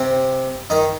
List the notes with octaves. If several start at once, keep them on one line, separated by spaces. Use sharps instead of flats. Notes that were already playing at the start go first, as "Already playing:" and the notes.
Already playing: C3 C4
D#3 D#4